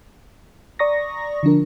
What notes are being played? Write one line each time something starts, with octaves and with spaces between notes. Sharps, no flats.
D5 A#5 C#6 D#6 A#6
D3 F3 D4 A#4